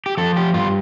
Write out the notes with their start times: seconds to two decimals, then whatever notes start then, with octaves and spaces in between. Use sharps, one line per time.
0.06 G4
0.17 F3 A4
0.36 G4
0.54 G2 F4